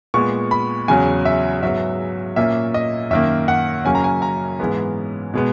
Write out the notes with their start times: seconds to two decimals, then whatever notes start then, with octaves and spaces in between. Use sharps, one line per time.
0.14 A#2 G#3 B3 C#6
0.51 B5
0.88 E2 C#3 F#3 G#5
1.25 E5
1.62 G#2 F#3 B3 E5
2.36 A#2 A#3 C#4 E5
2.74 D#5
3.10 F#2 D#3 A#3 E5
3.48 F#5
3.85 F#2 C#3 F#3 A#3 C#4 G#5
3.95 A#5
4.04 G#5
4.22 A#5
4.60 G#2 E3 G#3 B3
5.34 B2 G#3 B3